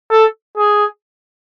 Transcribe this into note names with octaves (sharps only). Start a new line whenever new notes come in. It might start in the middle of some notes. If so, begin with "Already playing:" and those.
A4
G#4